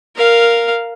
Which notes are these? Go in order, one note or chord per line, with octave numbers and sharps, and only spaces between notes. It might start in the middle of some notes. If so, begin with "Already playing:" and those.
A#4 F5